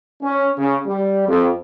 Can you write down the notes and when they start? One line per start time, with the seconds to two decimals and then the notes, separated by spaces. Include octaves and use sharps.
0.21 C#4
0.58 C#3
0.87 G3
1.27 F2